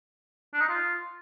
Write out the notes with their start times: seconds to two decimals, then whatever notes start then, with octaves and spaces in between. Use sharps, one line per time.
0.54 D4
0.61 D#4
0.69 F4